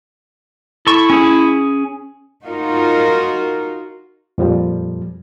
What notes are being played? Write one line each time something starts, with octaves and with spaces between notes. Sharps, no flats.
E4 A4 C#6
C#4 G#4
D#4 F4 F#4 A#4
F2 A#2 F3 G3